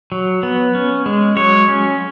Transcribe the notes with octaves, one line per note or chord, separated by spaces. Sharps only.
F#3
B3
C#4
G#3
F#3 C#5
C#4